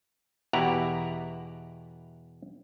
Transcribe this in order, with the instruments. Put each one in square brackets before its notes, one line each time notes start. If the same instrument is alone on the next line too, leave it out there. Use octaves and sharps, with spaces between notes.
[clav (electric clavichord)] E2 B2 E4 G4 F#5 A#5